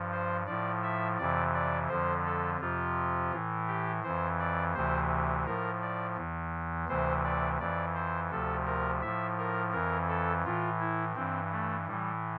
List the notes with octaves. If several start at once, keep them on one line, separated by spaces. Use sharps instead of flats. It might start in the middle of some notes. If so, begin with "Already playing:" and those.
Already playing: G2 F3
C5
A2 F3 D5
E5
F2 C3 E3 D5
D5
F2 D3 F3 C5
A4
F2 C3 F3 F4
A2 E3
G4
F2 E3 C5
D5
D2 C3 E3 C5
A2 F3 A#4
D5
E2 E3
D2 C3 E3 C5
D5
F2 E3 D5
C5
D2 C3 F3 A4
A#4
A2 F3 E5
A#4
F2 E3 A#4
A4
A2 E3 F4
E4
G2 E3 C4
A3
A2 E3 G3